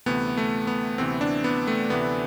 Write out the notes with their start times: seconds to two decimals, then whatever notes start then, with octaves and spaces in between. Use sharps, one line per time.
0.06 D2 C3 E3 A3 B3
0.37 A3
0.67 B3
0.98 D2 C3 E3 A3 C4
1.21 D4
1.44 B3
1.67 A3
1.90 D2 C3 E3 A3 B3